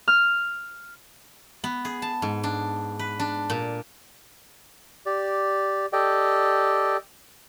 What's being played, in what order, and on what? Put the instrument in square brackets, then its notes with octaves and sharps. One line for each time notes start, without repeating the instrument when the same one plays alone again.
[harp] F6
[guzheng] B3
G#4
A5
G#2
D4
B4
D4
A#2
[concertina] G4 D5
G4 A4 D5 D#5 G5